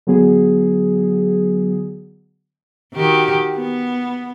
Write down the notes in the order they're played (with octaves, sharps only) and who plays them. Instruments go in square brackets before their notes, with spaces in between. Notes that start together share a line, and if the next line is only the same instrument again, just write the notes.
[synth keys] D3 F#3 B3 G#4
[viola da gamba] D#3 F#4 G4
B3